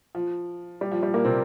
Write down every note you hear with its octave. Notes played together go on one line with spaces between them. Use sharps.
F3
G3
F3
G3
A#2 A#3
C3 C4